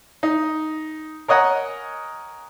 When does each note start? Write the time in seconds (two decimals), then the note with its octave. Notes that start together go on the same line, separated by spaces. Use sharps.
0.23 D#4
1.28 A#4 C#5 D#5 F#5 G#5 A#5